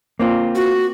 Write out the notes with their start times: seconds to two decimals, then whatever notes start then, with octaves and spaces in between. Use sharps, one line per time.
0.19 A#3 C4 F4
0.55 F#4